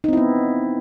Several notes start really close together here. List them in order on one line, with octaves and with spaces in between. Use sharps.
D#4 C4 E4 B3